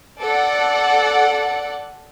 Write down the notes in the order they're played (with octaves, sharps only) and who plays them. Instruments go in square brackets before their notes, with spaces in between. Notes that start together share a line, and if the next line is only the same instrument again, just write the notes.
[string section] A4 D5 F#5